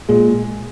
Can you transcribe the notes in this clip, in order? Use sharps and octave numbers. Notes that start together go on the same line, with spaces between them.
A#2 G#3